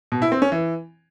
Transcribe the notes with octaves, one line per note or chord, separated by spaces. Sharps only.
B2
E4
C4
C#4
E3